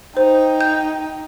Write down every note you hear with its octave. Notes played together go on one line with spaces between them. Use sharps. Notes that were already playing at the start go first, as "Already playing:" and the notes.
D#4 C5 G5
G6